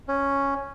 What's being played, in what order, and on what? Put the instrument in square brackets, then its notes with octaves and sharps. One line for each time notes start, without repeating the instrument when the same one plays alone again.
[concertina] C#4